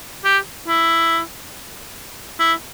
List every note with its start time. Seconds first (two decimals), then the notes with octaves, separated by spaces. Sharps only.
0.25 G4
0.68 E4
2.39 E4